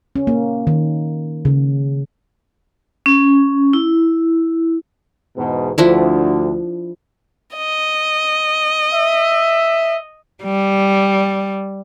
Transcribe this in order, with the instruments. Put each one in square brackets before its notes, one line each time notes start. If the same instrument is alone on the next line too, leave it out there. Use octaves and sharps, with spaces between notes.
[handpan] C#4
A#3
D#3
C#3
[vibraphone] C#4
E4
[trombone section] E2 G#2 B2
[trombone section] D2 [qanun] F3 D4 E4
[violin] D#5
[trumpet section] E5
[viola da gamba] G3